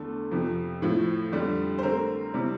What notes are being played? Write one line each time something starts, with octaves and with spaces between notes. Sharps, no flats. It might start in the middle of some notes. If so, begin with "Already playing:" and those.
Already playing: E2 D3 A3 A4
F2 C3 F3
A2 F3 A3 E4
F2 D3 G3
C5
D3 A3 C4 A#4
C3 G3 C4 E4